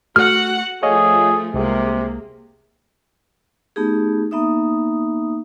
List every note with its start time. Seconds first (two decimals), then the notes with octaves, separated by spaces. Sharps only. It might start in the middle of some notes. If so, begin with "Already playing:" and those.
0.16 A3 F#4 F#5 F6
0.83 F3 A3 G#4 C#5 D#5 F5
1.54 C2 C3 G#3 A#3
3.76 A3 B3 D#4 G4 G#4
4.31 A#3 B3 D#4 E5 D#6